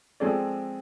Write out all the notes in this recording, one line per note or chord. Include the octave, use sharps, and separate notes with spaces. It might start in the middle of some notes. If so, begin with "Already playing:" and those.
F3 G#3 C4 G#4 A4 D5